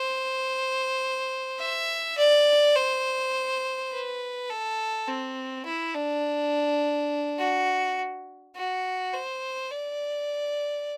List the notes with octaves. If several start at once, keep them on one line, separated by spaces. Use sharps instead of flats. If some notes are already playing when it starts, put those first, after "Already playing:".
Already playing: C5
E5
D5
C5
B4
A4
C4
E4
D4
F#4
F#4
C5
D5